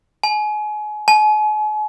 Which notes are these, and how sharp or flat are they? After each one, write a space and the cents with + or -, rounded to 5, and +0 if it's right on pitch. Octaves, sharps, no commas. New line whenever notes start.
G#5 +30
G#5 +45